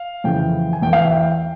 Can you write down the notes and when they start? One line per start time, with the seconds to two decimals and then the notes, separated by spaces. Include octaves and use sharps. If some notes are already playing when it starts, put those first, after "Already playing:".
Already playing: F5
0.24 F2 C#3 E3 G5
0.73 G#5
0.82 E2 E3 G5
0.93 F5
1.02 E5
1.12 G5